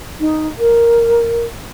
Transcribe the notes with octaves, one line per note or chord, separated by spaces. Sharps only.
D#4
A#4